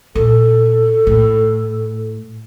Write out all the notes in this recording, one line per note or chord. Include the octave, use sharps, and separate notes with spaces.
A#2 A4
A2